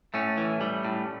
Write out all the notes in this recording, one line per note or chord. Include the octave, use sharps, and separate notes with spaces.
A2 A3 C#4
E3
G3
A2